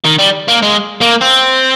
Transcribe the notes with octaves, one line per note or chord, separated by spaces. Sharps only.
D#3
G3
A#3
G#3
A#3
C4